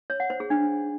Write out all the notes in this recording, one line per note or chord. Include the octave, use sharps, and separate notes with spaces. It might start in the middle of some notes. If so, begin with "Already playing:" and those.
C#5
F#5
C5
G#4
D4